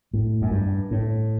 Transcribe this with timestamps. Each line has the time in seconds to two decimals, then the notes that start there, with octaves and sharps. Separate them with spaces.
0.13 A2
0.42 F#2
0.51 G2
0.91 A2